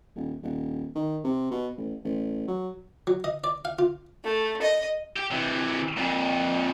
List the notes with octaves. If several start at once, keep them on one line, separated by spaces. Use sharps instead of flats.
D#1
D#1
D#3
C3
B2
A1
A1
F#3
F#3
D#5
D5
F5
F4
A3
D#5
G4
C3 E3
F2 A#2